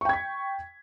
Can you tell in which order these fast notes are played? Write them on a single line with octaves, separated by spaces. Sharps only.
C#6 G5 G#6 B6